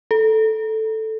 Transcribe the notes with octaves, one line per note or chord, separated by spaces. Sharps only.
A4